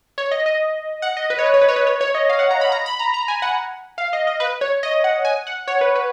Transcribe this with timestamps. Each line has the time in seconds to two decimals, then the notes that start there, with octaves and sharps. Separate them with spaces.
0.18 C#5
0.31 D#5
0.46 D#5
1.02 F#5
1.17 D#5
1.30 B4
1.39 C#5
1.46 B4
1.54 C#5
1.62 B4
1.69 C#5
1.76 B4
1.87 C#5
2.01 C#5
2.15 D#5
2.30 F5
2.39 F#5
2.51 A#5
2.61 B5
2.72 A#5
2.86 B5
2.99 A#5
3.14 A#5
3.28 G#5
3.42 F#5
3.98 F5
4.13 D#5
4.27 D#5
4.40 B4
4.61 C#5
4.83 D#5
5.04 F#5
5.25 G#5
5.47 F#5
5.68 C#5
5.81 B4
5.96 B4